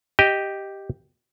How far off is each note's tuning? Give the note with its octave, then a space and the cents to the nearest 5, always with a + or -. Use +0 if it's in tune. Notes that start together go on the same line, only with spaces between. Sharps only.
G4 +0 D#5 +5 G5 +0